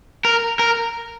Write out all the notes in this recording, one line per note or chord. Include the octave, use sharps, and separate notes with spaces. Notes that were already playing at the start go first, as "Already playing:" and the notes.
A#4
A#4